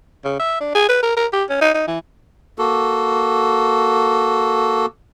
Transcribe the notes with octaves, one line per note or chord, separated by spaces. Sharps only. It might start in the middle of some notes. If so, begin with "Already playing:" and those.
C#3
E5
D4
G#4
B4
A#4
A#4
G4
C#4
D#4
D#4
E3
A#3 F#4 A4